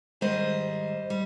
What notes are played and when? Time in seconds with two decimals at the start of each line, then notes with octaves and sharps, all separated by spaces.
0.21 G#2 D#3 G3 C5 D#5
1.10 G3